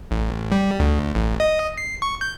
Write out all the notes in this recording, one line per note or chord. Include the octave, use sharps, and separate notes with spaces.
A1
G3
D2
A1
D#5
C7
C#6
G6